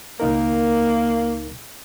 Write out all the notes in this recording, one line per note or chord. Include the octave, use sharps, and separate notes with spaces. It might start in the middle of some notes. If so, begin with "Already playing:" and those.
C#2 A#3 D#4 A#4